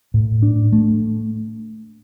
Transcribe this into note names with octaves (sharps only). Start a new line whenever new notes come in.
A2
D4
A3